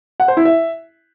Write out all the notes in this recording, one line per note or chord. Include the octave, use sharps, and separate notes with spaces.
F#5
C5
E4
E5